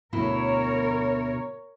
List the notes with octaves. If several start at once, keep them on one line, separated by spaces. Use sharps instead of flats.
D2 B2 E4 A#4 C#5